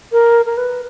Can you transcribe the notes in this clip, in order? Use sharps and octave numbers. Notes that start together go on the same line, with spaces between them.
A#4
A#4
B4